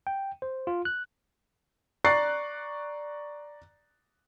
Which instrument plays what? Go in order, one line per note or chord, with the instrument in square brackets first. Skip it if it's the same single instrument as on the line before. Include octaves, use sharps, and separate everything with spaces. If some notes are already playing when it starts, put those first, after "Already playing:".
[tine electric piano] G5
C5
F4
F#6
[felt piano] D5 A#5 C#6 F#6 A6 C7